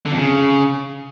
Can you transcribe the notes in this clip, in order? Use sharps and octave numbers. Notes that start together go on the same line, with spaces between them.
D3
F2
C#3